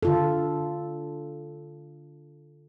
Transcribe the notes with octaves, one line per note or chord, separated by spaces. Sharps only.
D3 F4 A4